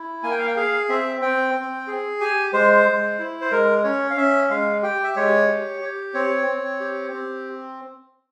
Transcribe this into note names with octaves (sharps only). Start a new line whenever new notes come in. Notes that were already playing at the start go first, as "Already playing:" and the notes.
Already playing: E4
A#3 G#5
G5
F5
G5
G#4 F5
C4 E5
C4 G5
C4
G#4
G4 G#5
G#3 C5
G#3
E4
C5
G#3 A#4
C#4 C#5
F5
C#4 E5
G#3 F5
G4 G5
E5
G#3 C#5
G4
G4
C4 C#5
C4
G4
C4